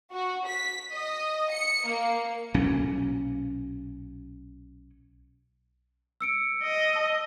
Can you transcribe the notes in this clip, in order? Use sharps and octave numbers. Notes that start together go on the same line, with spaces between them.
F#4
B6
D#5
C#7
A#3
B1 A#2 F#3 C#4
E6 C#7 D7
D#5
A5 E6